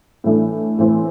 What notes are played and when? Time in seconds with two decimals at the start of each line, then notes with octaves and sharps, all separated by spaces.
0.24 A2 E3 A3 D4
0.78 A2 E3 C4